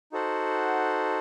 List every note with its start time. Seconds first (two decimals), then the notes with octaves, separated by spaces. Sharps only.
0.12 D#4 F#4 A4 C5 F#5